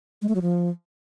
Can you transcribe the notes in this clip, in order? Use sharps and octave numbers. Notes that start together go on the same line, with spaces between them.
G#3
A3
F#3
F3